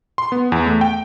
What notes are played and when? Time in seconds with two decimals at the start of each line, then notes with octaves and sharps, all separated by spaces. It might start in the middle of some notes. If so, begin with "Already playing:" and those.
0.18 C6
0.32 B3
0.52 E2
0.66 A3
0.81 G5